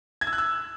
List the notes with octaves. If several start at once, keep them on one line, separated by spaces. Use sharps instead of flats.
G#6
E6
F#6
E6